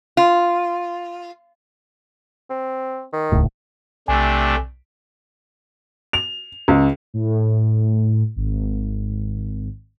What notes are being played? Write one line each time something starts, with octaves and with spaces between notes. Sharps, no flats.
F4
C4
D#3
D#1 C#2 A2
B1 C3 A3 D4 G#5
F7
C#2
A2
G#1